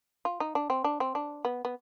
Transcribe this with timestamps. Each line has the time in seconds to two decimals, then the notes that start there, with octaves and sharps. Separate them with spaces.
0.25 F4
0.40 D#4
0.55 D4
0.70 C4
0.84 D4
1.00 C4
1.15 D4
1.45 B3
1.65 B3